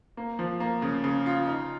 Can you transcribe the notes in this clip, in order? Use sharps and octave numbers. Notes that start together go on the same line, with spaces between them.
A#3
F3
A#3
C#3
C#3
F4
D#4